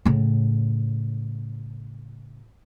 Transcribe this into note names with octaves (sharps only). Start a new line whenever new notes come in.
A2 C#3